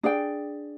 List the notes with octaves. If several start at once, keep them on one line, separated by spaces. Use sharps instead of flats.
D4 G#4 D5 G5